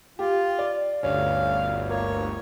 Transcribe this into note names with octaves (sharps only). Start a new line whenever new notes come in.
F4 G4
D5
G1 D2 C#4 F5
A#3 C#5